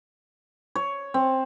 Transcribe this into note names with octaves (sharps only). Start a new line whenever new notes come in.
C#5
C4